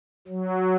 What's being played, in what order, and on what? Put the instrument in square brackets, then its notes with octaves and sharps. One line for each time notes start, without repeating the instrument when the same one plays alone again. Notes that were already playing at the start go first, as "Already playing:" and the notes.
[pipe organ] F#3